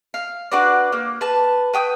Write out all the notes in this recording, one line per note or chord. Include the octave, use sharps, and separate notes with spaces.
F5
D4 F#4 B4 D5
A#3
B4 A5
B4 G5 D#6 G6